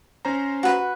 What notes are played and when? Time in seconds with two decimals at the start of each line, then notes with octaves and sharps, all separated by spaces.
0.25 C#4 C5 A#5
0.63 F#4 B4